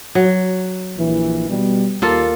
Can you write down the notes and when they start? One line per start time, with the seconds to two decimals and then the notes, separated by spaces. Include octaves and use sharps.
0.15 F#3
0.97 A#1 E3
1.48 B2 G3
2.02 D#2 A#3 F4 A4